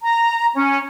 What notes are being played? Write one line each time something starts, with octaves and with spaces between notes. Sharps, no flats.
A#5
C#4